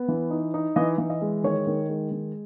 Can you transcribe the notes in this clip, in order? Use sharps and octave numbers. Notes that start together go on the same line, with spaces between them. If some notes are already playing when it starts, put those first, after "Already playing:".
Already playing: B3
E3
D#4
D#4
E3 D#5
E3
D#5
G#3
D#3 C#5
D#3
G#3
D#3